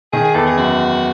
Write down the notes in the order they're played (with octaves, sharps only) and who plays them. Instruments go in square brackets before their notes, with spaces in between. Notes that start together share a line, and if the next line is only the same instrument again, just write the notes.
[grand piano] D#3 [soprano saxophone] G#4
[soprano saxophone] G#4
[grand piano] E2 [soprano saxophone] A4
[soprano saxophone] G#4
[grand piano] F#2 [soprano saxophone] F#4